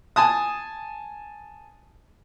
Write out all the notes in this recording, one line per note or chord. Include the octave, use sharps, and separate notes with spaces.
G#5 A5 D#6